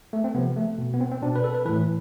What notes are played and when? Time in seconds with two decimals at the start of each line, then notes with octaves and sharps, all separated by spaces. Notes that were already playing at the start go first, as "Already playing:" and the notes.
0.13 A3
0.24 C4
0.34 C3 B3
0.37 F3
0.56 A3
0.78 B2
0.94 B3
1.01 C4
1.11 C4
1.22 B2 D4
1.36 B4
1.44 A4
1.55 B4
1.65 E3 B4
1.69 A2